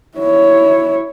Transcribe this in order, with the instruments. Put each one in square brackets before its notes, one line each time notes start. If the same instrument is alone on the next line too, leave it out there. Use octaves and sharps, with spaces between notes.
[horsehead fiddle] E4 C#5